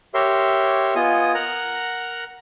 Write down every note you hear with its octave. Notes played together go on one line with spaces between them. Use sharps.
G4 A#4 C#5 E5 C6
B3 F4 D#5 G#5 D#6
A#4 F#5 A#5